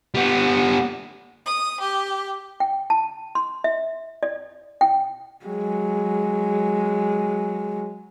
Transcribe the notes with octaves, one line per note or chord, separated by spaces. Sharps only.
G3 B3
D#6
G4
G5
A5
C6
E5
D5
G5
F#3 G#3